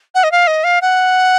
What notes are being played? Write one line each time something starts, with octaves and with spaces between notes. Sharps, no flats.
F#5
D#5
F5
D#5
F5
F#5